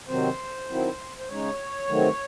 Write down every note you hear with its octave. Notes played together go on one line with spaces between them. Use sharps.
C3 D#3 F#3 C4 C5
D#3 F#3 C4 E4
C5
C#3 G#3 D#4 C#5
C3 D#3 F#3 A3 C4